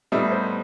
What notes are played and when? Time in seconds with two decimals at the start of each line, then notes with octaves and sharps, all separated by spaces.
0.12 A2 G3 B3 D#4 E5
0.32 C5